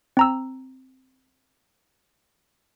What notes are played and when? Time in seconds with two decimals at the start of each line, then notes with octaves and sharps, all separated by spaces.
0.17 C4 A#5 E6